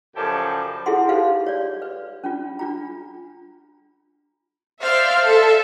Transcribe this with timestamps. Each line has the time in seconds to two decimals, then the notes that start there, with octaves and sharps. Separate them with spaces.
0.16 F#2 C#3 F3 G4 A4 D5
0.86 E4 F4 G#4 A4 F#5 C6
1.09 D#4 G4 A4 B4 C5 F5
1.46 C#5 D5
1.82 B4
2.24 C#4 D4 F4
2.59 D4 F4 A#5
4.81 C5 D5 E5 F5
5.26 A4 E5